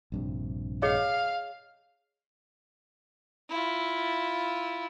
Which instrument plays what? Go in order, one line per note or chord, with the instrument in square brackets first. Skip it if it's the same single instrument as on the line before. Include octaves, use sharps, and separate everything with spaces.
[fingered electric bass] A#1 G2 C3
[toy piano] G#4 C#5 D#5 [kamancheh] F5
[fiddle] E4 F4